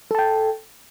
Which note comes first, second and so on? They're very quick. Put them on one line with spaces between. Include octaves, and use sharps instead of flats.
A4 A5 G5